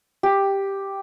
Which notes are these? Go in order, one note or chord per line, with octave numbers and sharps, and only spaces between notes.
G4